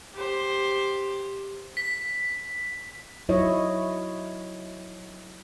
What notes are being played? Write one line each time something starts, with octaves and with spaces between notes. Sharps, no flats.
G4 C5
B6
F#3 E4 C#5 D#5